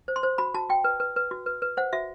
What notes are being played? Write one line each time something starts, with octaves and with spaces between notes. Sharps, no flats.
C5
C6
C5
F#4 B5
F#4 A5
F#4 G5
B4
B4
B4
F#4
B4
B4
C5 F#5
F#4 E5